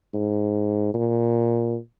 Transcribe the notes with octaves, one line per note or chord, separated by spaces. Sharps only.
G#2
A#2